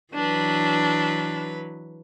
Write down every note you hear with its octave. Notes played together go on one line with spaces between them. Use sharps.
E3 F#3 D4 B4